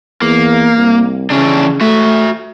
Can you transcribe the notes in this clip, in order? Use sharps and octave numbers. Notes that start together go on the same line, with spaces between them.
E2 A#3
C2
C#3 E3 C#4 D4
A3 F#4 E5